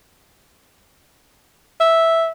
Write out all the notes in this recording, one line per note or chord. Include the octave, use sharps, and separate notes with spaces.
E5